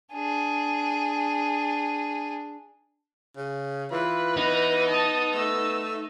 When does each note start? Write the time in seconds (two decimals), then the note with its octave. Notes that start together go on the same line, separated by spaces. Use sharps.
0.13 D4 G#4
3.37 C#3
3.92 E3 F4 B4
4.37 B3 D#4
4.89 A5 D#6
5.34 A3 E6